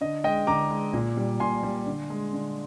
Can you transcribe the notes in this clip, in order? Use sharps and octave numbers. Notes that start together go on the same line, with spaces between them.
D3 D#5
G#3 D#5 G5
D3 A#5 D6
G#3
A#2
G3
A#2 G#5 C6
G3
D3
G#3
D3